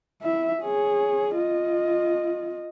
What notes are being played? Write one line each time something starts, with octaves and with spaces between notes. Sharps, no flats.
E4 E5
G#4 C#5
F4 D#5